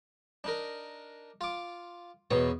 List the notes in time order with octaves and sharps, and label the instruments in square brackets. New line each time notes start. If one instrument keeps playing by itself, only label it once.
[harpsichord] D4 D#4 A#4
F4 D6
[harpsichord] E2 D#4 C#5 [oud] B2